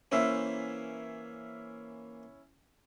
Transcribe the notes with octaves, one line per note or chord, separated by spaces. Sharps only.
E3 A#3 C#4 E4 C5 E5